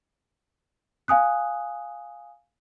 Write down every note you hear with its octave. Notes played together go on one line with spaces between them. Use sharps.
F5 G#5 D#6 F#6